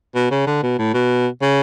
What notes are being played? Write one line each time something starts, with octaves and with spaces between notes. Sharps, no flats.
B2
C#3
D3
B2
A2
B2
C#3